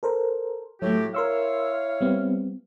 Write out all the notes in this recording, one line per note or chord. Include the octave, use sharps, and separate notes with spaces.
A4 A#4 C5
A2 F#3 A3 F#4 G4
E4 A#4 C#5 F5 C6 E6
G3 B3 C4